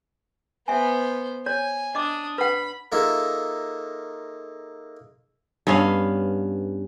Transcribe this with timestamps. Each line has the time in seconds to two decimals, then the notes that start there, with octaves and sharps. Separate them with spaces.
0.68 B3 C5 E5 G#5
1.46 C#5 G#5
1.95 D4 D#5 D6 D#6
2.38 B4 F#5 B5
2.92 A#3 D#4 F4 G#4 A4 E5
5.67 G2 B3 C#4 F5